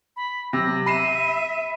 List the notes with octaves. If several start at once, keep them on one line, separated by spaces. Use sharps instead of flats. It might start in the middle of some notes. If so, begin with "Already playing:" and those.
B5
C3 F#3 A#6
E5 B5 C7 D#7 E7